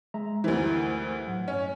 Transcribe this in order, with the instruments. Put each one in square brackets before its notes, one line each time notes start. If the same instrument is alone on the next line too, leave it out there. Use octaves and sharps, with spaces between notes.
[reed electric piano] G#3 E5 A#5
[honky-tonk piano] D2 E3 [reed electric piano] G4 A#4 C5
[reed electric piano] A2 F#3 F#5
[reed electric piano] G2 [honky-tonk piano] C#4